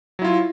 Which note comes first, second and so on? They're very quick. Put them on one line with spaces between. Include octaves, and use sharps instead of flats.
F#3 E4 F4